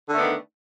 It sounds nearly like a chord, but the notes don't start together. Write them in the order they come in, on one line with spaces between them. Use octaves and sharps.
D3 A3 B3 D4 D#3